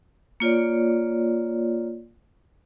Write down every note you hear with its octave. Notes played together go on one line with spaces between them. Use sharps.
A#3 F4 C#5 D5